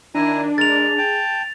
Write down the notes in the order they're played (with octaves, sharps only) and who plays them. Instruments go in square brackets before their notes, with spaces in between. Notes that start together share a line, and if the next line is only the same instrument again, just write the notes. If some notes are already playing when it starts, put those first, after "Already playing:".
[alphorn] D#3 [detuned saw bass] D4 [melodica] E4 G#5 A#5
[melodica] G#3 A#4 [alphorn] G#4 [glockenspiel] A6 F7
[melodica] G5 A5